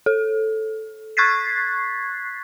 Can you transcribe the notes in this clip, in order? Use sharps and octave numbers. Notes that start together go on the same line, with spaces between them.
A4
C#6 F#6 G#6 A6 B6 C7